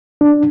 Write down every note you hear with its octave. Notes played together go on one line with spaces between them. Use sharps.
D4